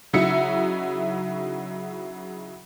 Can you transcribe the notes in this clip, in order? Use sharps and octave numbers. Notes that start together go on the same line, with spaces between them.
C#3 F#3 D#4 E4 E5 C#7